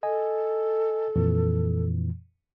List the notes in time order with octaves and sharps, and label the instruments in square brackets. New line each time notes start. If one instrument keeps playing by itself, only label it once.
[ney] A4 [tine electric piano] D#5 G#5
[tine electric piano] F2 A#2 E3